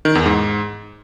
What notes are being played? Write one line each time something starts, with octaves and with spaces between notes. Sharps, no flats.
D#3
E2
G#2